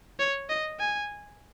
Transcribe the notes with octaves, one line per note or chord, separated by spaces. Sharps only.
C#5
D#5
G#5